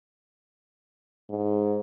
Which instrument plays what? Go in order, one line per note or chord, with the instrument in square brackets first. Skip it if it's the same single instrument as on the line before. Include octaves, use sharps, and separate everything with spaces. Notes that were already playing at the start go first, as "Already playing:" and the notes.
[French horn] G#2